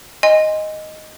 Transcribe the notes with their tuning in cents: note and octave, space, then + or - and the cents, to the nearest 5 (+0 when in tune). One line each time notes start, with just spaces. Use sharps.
D#5 +0 G#5 -25 C6 +0